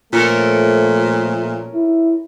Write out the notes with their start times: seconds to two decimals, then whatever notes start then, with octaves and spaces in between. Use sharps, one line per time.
0.13 A#2 F3 A3 C#4 A4 A#4
1.75 E4